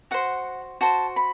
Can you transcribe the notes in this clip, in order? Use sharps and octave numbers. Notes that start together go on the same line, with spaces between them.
F#4 C5 F#5
F#4 C5 A5
B5